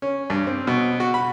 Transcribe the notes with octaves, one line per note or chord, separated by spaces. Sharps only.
C#4
G2
C4
B2
F#4
B5